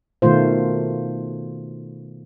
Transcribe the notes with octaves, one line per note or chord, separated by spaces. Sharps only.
B2 D#3 A3 F4 C5